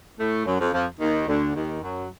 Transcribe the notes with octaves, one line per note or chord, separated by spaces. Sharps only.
A2 A3
F#2 F#3
F2 F3
F2 F3
D#2 D#3
D2 D3
D#2 D#3
F#2 F#3